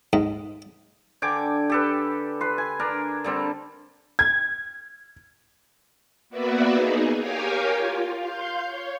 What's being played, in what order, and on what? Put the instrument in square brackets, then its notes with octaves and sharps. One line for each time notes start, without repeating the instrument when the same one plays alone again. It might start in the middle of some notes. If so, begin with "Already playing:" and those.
[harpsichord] G#2
[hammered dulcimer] D3 G5 G#5 D6
G4 A4 B4
B4 C6
G#5
D4 A#4
D3 G3 C4
[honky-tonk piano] G#6
[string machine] A#3 B3 F#4 B4 D5 E5
D#4 G#4
G4 A#4 C#5 F5 G5 G#5
F4
F5 C6 G6
C#5